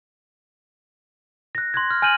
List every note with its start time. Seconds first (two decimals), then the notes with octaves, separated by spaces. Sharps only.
1.55 F#6 A#6
1.74 C6 F#6 G#6
1.91 F6
2.02 G#5 F6 G6 D#7 F#7